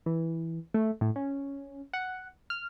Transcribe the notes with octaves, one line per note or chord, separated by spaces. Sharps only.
E3
A3
A2
C#4
F#5
F6